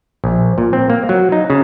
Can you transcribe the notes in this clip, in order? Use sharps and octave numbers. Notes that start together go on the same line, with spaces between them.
A#1
A#2
C4
A#3
F#3
D#4
C#3